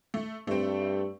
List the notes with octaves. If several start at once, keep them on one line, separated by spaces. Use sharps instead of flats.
A3
G2 A3 C4